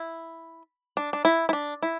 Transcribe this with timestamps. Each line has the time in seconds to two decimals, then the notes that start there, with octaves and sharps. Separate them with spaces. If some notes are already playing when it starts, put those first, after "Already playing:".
Already playing: E4
0.97 D4
1.13 D4
1.25 E4
1.49 E4
1.53 D4
1.82 E4